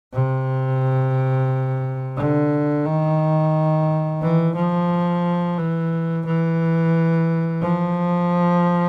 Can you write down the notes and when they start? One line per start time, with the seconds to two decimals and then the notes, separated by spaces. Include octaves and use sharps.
0.13 C3
2.17 D3
2.86 D#3
4.21 E3
4.56 F3
5.58 E3
6.26 E3
7.61 F3